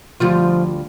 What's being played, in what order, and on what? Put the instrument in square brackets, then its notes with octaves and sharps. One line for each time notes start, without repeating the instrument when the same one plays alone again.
[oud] D2 G3 F4 [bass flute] F3